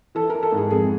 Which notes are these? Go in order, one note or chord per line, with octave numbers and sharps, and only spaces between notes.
E3 A4
E3 A#4
A4
G#2
G#4
F2 G#4